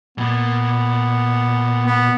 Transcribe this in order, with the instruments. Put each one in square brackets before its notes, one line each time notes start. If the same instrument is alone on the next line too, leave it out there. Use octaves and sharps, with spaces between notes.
[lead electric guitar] A#2 [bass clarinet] B3
[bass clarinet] B3